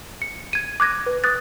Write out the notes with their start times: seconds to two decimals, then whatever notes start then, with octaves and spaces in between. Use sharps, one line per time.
0.22 C#7
0.53 G#6 D#7
0.80 D6 F#6 G#6 A#6
1.06 B4
1.24 D6 D#6 F#6 A6